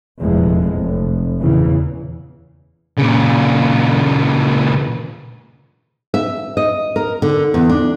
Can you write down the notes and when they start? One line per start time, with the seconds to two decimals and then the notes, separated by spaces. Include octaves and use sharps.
0.20 F1 E2 A#2 F3 G#3
0.74 F1
1.41 E2 A#2 C#3 E3
2.98 A#2 C#3
6.14 E5
6.57 D#5
6.96 A#4
7.22 D3
7.54 E2
7.69 D4